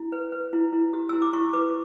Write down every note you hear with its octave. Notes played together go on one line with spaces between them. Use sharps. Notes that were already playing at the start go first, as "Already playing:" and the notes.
Already playing: E4
B4
B4
E4
E4
G4
E4 E6
D6
E4 C#6
B4 D6